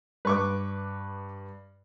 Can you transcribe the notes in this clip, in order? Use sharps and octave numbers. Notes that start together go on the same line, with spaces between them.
G2 B4 C#6 D6